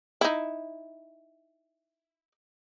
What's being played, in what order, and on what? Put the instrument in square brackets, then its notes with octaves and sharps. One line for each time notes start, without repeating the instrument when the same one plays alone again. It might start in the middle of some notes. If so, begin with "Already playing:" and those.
[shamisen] D#4 E4